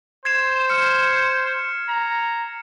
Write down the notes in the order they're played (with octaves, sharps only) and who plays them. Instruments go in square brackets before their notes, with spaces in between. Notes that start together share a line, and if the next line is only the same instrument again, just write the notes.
[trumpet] C5 [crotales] G#6 C7 E7
[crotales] F6 C#7
[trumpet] A#5